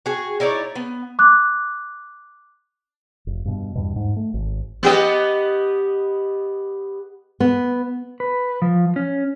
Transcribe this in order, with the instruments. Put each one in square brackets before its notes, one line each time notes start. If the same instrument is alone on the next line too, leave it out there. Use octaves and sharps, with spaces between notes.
[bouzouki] F#4 G#4
D#4 E4 C#5 D5
B3
[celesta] D6 F#6
[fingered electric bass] F1
G2 B2
E2 G2 B2
G#2
A3
G#1
[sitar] B3 G4 D#5
[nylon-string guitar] B3
[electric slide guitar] B4
F3
C#4